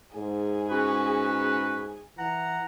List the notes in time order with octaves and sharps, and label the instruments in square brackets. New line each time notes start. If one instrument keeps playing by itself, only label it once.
[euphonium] G#2 [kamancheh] G#4
[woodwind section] C#4 F#4 B4
[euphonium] E3 [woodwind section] F#5 A#5